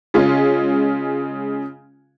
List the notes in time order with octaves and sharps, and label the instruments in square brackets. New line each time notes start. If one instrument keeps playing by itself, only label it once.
[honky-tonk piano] C#3 G#3 C#4 F4